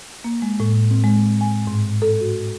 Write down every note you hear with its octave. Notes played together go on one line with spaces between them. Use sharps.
A#3
G#3
A2
C4
G#3
G#5
G#2
A4
F#4